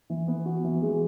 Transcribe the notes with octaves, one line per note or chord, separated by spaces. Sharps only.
E3
B3
F#4
E3
G#3